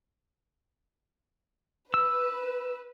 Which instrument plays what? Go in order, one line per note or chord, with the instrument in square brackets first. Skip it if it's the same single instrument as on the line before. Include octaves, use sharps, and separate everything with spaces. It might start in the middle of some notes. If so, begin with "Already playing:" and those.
[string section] B4 [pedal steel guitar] E6